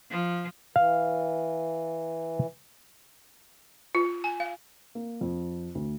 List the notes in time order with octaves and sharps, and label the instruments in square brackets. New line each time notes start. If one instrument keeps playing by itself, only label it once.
[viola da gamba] F3
[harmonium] E3 [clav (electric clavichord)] F5
[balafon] F4
G#5
F5
[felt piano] A#3
F2
D2